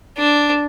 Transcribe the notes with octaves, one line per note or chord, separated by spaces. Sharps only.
D4